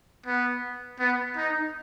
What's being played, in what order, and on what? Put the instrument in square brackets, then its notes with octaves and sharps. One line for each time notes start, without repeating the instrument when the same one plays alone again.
[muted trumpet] B3
B3
D#4